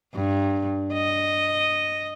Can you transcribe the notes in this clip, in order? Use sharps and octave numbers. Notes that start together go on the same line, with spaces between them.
G2
D#5